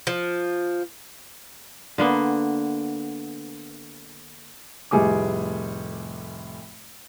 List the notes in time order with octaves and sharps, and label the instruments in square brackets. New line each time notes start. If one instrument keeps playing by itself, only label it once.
[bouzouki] F3
[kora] D3 A#3 B3
[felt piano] F1 A2 G3 G#4 G#5 D6